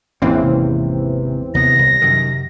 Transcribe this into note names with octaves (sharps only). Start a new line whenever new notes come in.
G#1 E2 E3 A#3 C4 C#4
C3
D#2 C3 B3 A#6
C2
F#2 D#3